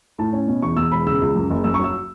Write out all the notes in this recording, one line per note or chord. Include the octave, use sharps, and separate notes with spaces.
A2 A5
C#4
B2
E2 C#6
E2 E6
E1 B5
C#3 E6
C#2
F#2
F#1
F#2 E6
C#6
F#3 E6